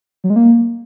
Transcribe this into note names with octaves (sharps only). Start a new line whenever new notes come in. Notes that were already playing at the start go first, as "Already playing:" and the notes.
F#3
G#3
A#3